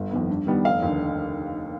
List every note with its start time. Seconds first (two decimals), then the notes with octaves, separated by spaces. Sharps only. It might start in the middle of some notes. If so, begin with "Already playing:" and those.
Already playing: G1
0.11 F2 D#3 B3
0.30 G2
0.47 D#3 G3 B3
0.65 F1 F5
0.83 D#2 D3